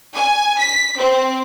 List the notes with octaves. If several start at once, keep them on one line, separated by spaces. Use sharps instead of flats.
G#5
B6
C4